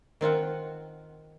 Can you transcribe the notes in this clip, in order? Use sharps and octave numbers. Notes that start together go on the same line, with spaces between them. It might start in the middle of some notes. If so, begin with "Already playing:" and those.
D#3 C4 F4 F#5